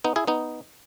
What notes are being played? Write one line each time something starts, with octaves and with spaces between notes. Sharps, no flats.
B3 D#4
E4 G#4
B3 D#4